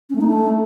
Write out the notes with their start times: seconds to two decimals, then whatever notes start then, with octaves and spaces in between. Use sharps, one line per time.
0.10 C#4
0.15 A3
0.21 D#4
0.27 A3